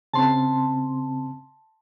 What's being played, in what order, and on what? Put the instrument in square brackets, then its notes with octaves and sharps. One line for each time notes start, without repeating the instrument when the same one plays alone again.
[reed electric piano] C#3 C4 [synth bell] A5 C6